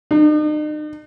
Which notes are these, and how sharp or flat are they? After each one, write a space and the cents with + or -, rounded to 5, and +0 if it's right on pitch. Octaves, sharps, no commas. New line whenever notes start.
D#4 -45